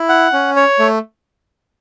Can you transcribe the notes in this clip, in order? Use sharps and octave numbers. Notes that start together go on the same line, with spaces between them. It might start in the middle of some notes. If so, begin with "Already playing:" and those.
Already playing: E4
F#5
C#4
C#5
A3